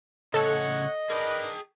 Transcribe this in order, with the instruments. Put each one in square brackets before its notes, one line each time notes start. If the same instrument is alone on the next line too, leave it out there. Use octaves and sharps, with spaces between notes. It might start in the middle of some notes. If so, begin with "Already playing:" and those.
[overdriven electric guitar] A2 C#3 [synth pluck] A4 [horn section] C#5 F#5 [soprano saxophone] D#5
[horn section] D4 A#4 B4 [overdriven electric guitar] G#4 G5